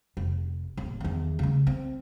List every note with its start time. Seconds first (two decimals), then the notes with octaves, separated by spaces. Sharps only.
0.17 F1
0.77 D1 A#2
1.00 E2 D#3
1.39 C#3 A3
1.67 C4